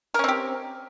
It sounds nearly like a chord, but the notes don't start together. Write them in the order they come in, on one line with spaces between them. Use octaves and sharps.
A#4 C#4 C4 G4